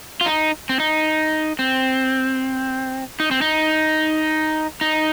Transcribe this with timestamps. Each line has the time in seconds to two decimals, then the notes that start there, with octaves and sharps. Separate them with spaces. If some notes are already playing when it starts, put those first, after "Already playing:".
0.21 F4
0.26 D#4
0.69 C4
0.80 D#4
1.59 C4
3.20 D#4
3.31 C4
3.41 D#4
4.81 D#4